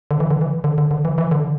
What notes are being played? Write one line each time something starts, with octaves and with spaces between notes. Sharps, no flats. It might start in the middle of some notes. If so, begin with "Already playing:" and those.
D3
E3
D3
E3
D3
D3
D3
E3
E3
D3